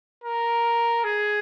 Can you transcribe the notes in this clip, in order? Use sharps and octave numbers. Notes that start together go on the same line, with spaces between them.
A#4
G#4